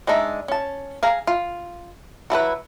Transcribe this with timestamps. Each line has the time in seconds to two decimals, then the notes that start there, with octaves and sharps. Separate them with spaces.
0.07 G#3 D4 D#4 E5
0.48 C#4 A5
1.03 G#4 F5 A#5
1.27 F4
2.30 F#3 E4 A4 B4